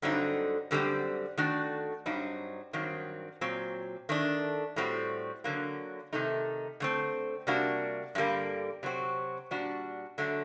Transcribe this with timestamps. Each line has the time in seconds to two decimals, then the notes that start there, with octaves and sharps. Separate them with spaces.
0.02 G2 D3 F#3 C4 D#4
0.71 F#2 D3 G3 C4
1.37 D#3 A3 D4 F#4
2.06 G2 F#3 C4 D#4
2.73 G2 D#3 F#3 C4
3.41 A#2 F#3 C4
4.09 D#3 A3 D4
4.76 A2 G3 C4 F#4
5.44 D3 F#3 A#3
6.13 C3 D#3 A3 D#4
6.80 D3 A3 C4
7.47 C3 G3 A#3 D4 F#4
8.15 G2 D3 G3 A#3
8.83 C3 F#3 C4 F#4
9.51 A#2 G3 D4 F#4
10.18 D3 F#3 A3